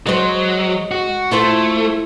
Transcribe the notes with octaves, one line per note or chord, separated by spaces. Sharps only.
F#3 G#3 C5
F#4
A3 E4 F4 C5